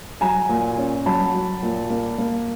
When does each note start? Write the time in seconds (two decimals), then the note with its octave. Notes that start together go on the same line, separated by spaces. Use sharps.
0.21 F#3 G#5 A#5
0.49 A#2
0.78 C#4
1.06 F#3 A5 B5
1.34 F#3
1.63 A#2
1.90 A#3
2.18 A#3